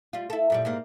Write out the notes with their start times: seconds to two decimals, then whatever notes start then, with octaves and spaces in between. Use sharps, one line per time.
0.13 G3 F4
0.30 E4 A4
0.50 F#2 A#2 G3
0.65 G#2 G3 A#3